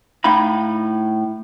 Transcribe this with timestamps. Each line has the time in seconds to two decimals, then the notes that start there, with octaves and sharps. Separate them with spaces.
0.24 A2 D#4 F5 A#5 B5